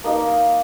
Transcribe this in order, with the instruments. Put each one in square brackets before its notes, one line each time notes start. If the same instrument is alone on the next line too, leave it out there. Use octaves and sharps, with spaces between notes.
[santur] A#3 D#4 A#4 D#5